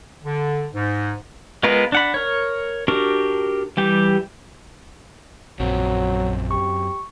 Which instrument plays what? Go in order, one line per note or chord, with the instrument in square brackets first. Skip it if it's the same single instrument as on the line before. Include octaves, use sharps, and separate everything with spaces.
[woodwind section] D3
G#2
[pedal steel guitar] G#3 B3 F4 A#4 B4
D4 F#5 B5
A#4 C#5
D4 F#4 G4 A#4
E3 G3 G4
[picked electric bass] A#1 [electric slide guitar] F#2 C4 [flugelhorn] F#3
[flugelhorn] G4 [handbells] C#6